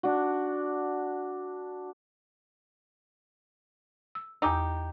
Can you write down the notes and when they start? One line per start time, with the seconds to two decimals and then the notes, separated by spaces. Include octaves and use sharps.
0.03 D4 F#4
4.15 E6
4.42 E2 D#4 G4 D6 E6